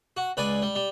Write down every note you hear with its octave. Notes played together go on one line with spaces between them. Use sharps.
F#4
C#2 B4 D5 G#5
G3
G3